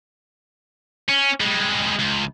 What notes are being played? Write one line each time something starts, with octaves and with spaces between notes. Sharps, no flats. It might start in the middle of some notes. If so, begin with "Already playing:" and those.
C#4
G3 G#3
C#2